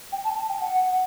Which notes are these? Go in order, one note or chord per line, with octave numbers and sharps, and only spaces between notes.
G5
A5
A5
G5
F#5